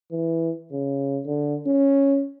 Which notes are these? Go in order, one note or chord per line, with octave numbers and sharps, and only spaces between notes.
E3
C#3
D3
C#4